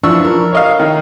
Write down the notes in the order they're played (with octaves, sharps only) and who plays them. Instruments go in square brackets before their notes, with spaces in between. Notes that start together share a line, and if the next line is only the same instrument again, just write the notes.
[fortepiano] E3 C#6 E6 [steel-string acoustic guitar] F3 D4
[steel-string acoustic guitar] A#4
[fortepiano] C#5 D#5 F5
D#3